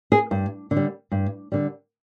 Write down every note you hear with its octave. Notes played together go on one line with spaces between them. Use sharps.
G#4
G2
D3
G3
G2
D3 G3